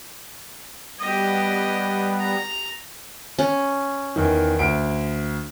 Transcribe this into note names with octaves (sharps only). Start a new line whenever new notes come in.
G3 B3 G4 D#5
A#5
C#4
E2 D#3
D2 D7